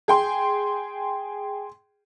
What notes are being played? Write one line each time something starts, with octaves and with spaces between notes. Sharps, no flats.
G#4 G5 C6